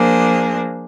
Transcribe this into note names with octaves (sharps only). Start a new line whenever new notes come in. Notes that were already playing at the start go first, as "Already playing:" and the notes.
Already playing: F3 A#3 D4 G#4 C5